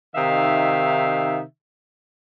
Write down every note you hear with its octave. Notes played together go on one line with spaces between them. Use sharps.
C3 D#3 D#4 E5 F5